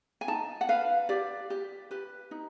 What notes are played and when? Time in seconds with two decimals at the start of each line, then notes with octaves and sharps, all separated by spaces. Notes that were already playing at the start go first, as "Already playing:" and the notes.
0.21 G#5
0.28 D#4 A5
0.61 F#5
0.69 B4 F5
1.09 G4 D5
1.50 G4
1.91 G4 B4
2.31 D#4